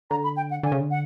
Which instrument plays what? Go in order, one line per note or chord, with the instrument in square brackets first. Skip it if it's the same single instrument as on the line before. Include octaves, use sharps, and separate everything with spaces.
[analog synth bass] D3 [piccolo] A#5
[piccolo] B5
G5
F#5
[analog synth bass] D3 [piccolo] G#5
[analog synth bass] C#3
D3
[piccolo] F#5